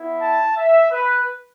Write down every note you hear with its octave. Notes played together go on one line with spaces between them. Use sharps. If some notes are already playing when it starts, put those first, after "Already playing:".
Already playing: B3 E4
A5
E5
B4